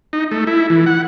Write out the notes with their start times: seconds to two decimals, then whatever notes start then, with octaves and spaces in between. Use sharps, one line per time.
0.13 D#4
0.31 A3
0.47 E4
0.70 E3
0.86 F#5